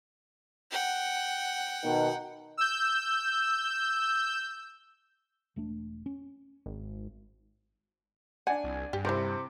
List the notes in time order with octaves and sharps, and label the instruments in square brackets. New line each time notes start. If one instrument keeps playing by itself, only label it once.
[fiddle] F#5 G5
[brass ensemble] B2 D#3
[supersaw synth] E6 G6
[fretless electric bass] E1 A3 D4
C#4
[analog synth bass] G#1
[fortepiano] D4 G#5 [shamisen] F#5
[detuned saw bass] C2
[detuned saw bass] G2 [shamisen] G4
[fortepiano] C3 C4 [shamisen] E4 A#4